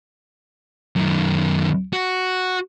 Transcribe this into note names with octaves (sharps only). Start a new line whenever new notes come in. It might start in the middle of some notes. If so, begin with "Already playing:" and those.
F#2 D#3
F#4